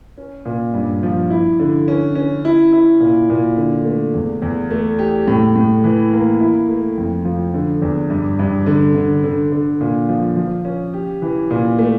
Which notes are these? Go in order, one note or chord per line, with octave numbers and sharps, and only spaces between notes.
C#4
A#2
G2
F3
E4
D3
C#4
C#4
E4
E4
A#2
A#2
D3
A3
E2
E2
A3
G4
A2
A2
E3
A#3
E4
A3
F2
F3
D3
E2
G2
G2
D3
D3
D3
D3
A#2
F3
F3
C#4
G4
E3
A#2
A3